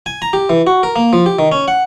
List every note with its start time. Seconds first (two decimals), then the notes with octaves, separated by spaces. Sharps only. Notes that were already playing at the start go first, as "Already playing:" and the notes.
0.06 G#5
0.22 A#5
0.33 G4
0.49 E3
0.67 F#4
0.83 A#4
0.96 A#3
1.13 F3
1.26 G4
1.39 D#3
1.52 C#4
1.68 F#5